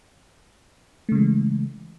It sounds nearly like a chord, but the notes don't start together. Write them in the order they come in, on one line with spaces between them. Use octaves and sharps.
A3 C#3 G#3 E3